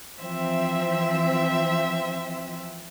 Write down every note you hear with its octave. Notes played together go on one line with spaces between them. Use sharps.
E3 F3 C4 E5